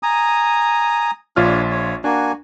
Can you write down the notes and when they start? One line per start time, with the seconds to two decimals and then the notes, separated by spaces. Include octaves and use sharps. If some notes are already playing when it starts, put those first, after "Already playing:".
0.03 G#5 A#5 D#6
1.36 A#1 D4 F4 C#5 F6
1.71 C#5
2.04 A#3 D4 F#4 G#5